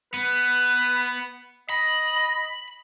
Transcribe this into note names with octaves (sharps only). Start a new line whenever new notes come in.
B3 B4
D#5 B5